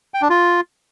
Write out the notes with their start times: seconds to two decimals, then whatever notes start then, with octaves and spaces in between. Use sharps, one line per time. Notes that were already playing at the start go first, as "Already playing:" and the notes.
0.14 G5
0.22 D4
0.30 F4